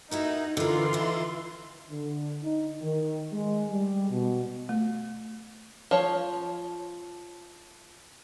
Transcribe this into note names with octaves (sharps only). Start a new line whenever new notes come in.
D#4 E4 F#4 A#4
D3 E3 F4 A#4 C6
D#4 E4
D3
D#4
D#3
G#3
G3
B2
A3
F3 C#5